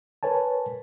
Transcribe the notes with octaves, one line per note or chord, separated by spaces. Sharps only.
A#4 B4 C#5 G#5 A5